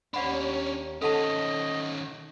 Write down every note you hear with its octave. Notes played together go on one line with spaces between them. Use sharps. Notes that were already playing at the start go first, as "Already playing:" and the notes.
D#2 C#4 D4 D5 F#5 B5
D#3 C#4 A4 D#5 F#5 A5